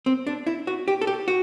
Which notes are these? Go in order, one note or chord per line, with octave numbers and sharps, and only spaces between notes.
C4
D4
E4
F#4
G4
A4
G4
F#4